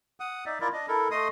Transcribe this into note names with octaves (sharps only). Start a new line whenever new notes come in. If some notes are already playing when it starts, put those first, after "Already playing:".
F#5 D#6
D#4 D5 E5
E4 F4 A#4 D5
D4 D#5
E4 A4 A#4
A3 D#5 C6 D#6